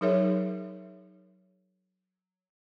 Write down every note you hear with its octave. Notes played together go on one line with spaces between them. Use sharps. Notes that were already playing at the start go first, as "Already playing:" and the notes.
F#3 D#4 G#4 A#4 C#5 E5